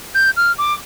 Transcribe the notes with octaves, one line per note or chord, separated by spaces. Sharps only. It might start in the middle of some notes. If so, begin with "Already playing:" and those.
G6
F6
D6